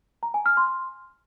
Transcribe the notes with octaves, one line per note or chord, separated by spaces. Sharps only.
A#5
G#5
F6
C6